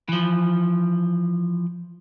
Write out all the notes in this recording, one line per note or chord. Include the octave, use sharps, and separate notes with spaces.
E3 F3